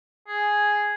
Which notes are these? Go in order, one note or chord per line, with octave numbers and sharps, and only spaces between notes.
G#4